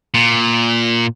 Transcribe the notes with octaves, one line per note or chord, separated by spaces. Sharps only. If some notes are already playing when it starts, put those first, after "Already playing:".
A#2